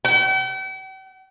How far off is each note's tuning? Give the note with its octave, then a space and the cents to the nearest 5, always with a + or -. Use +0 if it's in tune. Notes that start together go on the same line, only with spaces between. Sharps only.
G5 -45